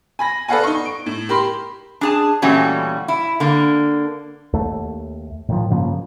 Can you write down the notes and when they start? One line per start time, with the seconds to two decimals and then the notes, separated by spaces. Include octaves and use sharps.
0.19 G#5 B5 A#6
0.48 A4 B4 D5 F5 F#5 G#5
0.63 D#4 C#6
0.85 D7
1.06 A2
1.29 G4 A#4 B5 C6
2.01 D4 G#4 A5
2.42 A#2 E3 G3 A3 C#4 F#4
3.08 E4
3.40 D3 A#3
4.53 D#2 A3
5.49 A2 D#3 F3
5.70 G2 C#3 F3 A#3